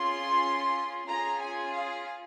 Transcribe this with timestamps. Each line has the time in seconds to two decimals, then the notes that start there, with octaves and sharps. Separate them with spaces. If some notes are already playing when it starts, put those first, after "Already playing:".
Already playing: C#4 F4 G#4 C6
1.07 C#4 F4 G#4 A#5
1.41 G#5
1.74 F5